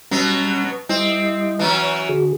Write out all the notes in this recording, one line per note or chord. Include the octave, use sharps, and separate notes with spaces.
B2 F#3 G3 B3 C#4
G3 C4 E4 D#5
E3 F#3 C#4
D3 F#4 G#4